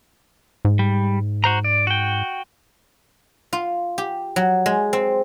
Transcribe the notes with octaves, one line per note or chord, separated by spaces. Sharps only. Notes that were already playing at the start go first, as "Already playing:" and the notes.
G#2
G3
F#4 C5 A#5
D5
F#4 G5
F4
G4
F#3
G#3
C4